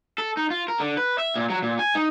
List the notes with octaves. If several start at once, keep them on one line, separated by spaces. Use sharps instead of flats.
A4
D#4
F4
A#4
D3
B4
E5
A#2
F#3
A#2
G#5
D#4